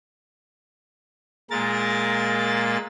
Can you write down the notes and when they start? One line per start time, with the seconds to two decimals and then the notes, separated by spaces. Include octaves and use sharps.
1.51 A#2 G#3 A#3 A#4 A6